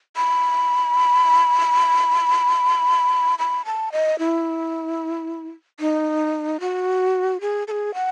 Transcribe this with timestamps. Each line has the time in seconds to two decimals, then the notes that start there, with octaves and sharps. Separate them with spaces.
0.16 B5
3.39 B5
3.65 A5
3.92 D#5
4.19 E4
5.80 D#4
6.60 F#4
7.41 G#4
7.68 A4
7.71 G#4
7.94 F#5